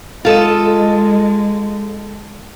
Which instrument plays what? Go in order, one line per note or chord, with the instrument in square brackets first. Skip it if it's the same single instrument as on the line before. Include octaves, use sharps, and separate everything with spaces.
[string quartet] G#3 [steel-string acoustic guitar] F4 A4 D#5